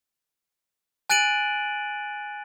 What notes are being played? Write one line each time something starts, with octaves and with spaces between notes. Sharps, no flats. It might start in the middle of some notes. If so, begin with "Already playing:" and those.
G#5 F#6 A6 D7 D#7 F#7